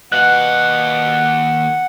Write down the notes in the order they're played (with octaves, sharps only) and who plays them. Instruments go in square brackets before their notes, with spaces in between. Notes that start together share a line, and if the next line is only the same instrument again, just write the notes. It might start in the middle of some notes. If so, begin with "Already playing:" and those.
[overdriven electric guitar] D#2 F5 [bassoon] B2 [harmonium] F#5 [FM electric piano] F#6